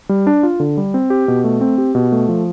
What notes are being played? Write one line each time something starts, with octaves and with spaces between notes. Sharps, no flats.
G3
D4
F4
D3
G3
C4
G4
B2
A3
C4
G4
B2
A3
F3